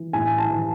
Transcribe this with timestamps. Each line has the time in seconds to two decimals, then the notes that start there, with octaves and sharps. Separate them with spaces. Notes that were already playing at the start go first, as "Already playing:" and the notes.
Already playing: E3
0.13 A2 G#5
0.38 A5
0.50 E3